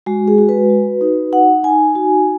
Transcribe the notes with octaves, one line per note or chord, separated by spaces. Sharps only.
G#3 F#4
G#4
F#4
B4
F#4
D#4
D#4 F#5
D#4 G#5
F#4